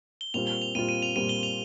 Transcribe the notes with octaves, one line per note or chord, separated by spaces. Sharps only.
G7
A#2 G3 C4 F4 F7
G7
F7
A#2 G3 C4 F4 D#7
D#7
F7
A#2 G3 C4 F4 D#7
G7
F7